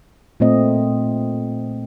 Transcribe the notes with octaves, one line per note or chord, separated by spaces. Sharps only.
A#2 A3 C4 D#5